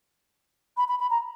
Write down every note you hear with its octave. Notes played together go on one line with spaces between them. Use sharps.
B5
B5
B5
A#5